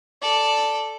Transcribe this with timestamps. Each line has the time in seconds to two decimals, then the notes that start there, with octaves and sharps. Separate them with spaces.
0.22 A4 D5